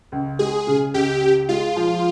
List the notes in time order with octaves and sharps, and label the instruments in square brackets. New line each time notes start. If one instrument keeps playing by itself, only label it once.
[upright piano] C#2
[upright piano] G#3 [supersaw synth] G#4
[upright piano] C#3
[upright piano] C#2 [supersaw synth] G4
[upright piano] C#2
[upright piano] G#3 [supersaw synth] F4
[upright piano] F3